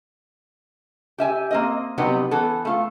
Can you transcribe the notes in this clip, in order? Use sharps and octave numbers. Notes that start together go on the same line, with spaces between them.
G4 E5 G#5
A#3 C4 D#5
C3 F#3 G3 B3 D#4 G4
E3 B3 A4
A3 F4